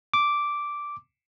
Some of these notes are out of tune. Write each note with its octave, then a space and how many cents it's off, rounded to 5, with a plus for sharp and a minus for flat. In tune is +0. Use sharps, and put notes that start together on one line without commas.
D6 -5